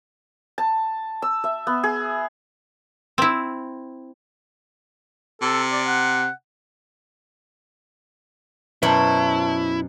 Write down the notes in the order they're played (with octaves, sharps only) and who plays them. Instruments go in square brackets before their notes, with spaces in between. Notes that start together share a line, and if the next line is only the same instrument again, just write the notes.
[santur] A5
E6
E5
B3
G#4
[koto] C4 E4
[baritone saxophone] C3 [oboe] A4
[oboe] D5
F#5
[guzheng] F#2 B2 C5 [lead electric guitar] E4 [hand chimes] B4 A5